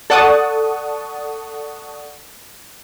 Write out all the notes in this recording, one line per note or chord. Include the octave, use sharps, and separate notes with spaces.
A4 D5 F#5 A5 C#6 D#6